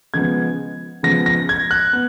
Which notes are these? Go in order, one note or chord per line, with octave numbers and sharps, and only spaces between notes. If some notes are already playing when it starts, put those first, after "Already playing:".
C#3 F3 G#3 B3 G#6
C#3 F3 G#3 B3 A#6
A#6
G#6
F#6
B3